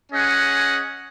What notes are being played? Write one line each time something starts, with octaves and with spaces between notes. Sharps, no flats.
C#4 G#4 D#5 F#5